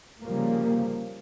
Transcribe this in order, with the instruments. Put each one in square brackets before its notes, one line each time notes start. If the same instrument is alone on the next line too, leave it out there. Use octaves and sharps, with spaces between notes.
[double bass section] C#3 F3 G3 A#3